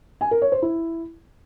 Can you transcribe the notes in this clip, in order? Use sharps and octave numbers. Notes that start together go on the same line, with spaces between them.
G#5
A#4
C#5
C5
E4